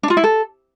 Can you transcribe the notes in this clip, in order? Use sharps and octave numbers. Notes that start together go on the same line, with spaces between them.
D4
F4
E4
A4